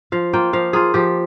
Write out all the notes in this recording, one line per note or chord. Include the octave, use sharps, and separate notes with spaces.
F3 F5
A#3 F4 G5
F3 F5
A#3 F4 G#4
F3 G4